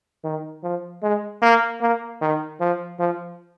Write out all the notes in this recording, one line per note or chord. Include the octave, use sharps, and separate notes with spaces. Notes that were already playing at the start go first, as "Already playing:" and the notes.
D#3
F3
G#3
A#3
A#3
D#3
F3
F3